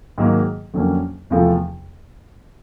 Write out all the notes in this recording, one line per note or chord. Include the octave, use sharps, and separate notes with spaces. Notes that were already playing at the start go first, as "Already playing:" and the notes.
G#2 D#3 F#3 A#3
F2 D3 F#3 A#3 C#4
E2 C3 F3 A3